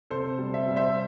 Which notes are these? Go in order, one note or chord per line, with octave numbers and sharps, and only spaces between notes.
C3 A4 C5
G3
E5
G3
C5 E5